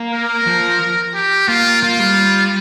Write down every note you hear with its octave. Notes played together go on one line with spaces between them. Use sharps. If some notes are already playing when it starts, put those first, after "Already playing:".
Already playing: A#3
A#4
F3
G4
A#3 F4
A#3 F4
G3